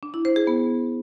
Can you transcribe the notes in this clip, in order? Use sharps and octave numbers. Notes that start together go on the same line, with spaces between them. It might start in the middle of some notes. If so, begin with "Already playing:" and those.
D4
E4
C5
G#4
B3